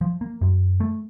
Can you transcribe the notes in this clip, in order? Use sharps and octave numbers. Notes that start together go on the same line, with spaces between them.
F3
A#3
F#2
A3